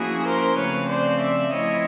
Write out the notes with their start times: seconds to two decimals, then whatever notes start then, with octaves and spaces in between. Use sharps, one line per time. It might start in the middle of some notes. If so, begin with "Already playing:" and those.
Already playing: F3 A#3 C#4 E4 F#4 G#4
0.25 A#4 C5
0.56 C#3 F3 A3 C4 B4 C#5
0.88 C5 D5
1.20 D5 E5
1.51 F3 A3 C4 E4 C#5 D#5